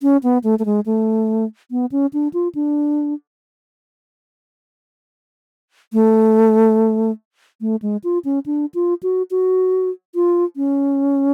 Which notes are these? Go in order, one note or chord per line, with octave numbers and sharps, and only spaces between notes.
C#4
B3
A3
A3
G#3
A3
B3
C#4
D4
F4
D4
A3
A3
G#3
F4
C#4
D4
F4
F#4
F#4
F4
C#4